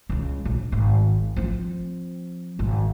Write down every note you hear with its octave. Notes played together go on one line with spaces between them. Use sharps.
C#2 C#3
A#1
G#1
F3 C4
G#1